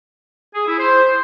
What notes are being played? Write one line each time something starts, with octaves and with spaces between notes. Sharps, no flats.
G#4
E4
C5